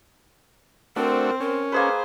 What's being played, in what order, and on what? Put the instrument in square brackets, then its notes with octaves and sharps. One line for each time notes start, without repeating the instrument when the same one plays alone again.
[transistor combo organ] A3 D4 F#4 [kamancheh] C4 C5 [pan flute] A#4
[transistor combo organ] C#4 [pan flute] A#4
[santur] A#3 G#4 B4 [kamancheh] C5